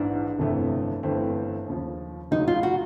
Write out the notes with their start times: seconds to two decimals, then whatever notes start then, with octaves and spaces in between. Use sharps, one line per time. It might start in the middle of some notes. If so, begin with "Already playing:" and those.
Already playing: A#1 G#2 E3 D4
0.39 G1 F2 C3 E3 A3
1.03 G1 G2 E3 A3 C4
1.66 D#2 C#3 F3
2.31 C#2 C#3 F#3 D#4
2.48 F4
2.63 F#4